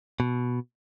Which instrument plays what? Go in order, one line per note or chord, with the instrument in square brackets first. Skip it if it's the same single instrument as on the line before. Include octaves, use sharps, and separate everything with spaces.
[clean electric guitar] B2